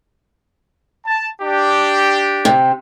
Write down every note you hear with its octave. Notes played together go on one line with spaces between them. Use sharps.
A5
D4 G4
C3